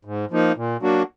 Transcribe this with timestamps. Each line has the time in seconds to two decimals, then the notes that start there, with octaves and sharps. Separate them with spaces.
0.05 G#2
0.31 F3 A#3 D#4
0.57 A#2
0.82 F#3 A#3 D4 F#4